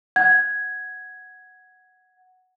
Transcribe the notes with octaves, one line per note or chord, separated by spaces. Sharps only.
F#5 G#6